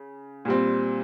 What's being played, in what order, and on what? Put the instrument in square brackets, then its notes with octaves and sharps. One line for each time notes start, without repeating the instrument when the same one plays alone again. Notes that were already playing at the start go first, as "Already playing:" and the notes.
Already playing: [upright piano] C#3
A#2 G3 C4